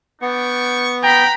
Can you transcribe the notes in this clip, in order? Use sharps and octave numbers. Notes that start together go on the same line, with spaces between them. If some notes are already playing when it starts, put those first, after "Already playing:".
B3 D4 G5 C#6
B4 G5 A#5 B5